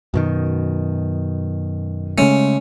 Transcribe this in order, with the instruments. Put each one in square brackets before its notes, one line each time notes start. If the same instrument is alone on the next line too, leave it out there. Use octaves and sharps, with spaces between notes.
[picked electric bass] F#2 B2 D#3
[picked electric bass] C#3 G#3 A3 [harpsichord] C#4